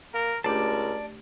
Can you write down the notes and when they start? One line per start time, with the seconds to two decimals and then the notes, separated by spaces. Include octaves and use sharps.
0.14 A#3 A#4
0.44 C#2 A3 D4 G4 A#4 D5 A5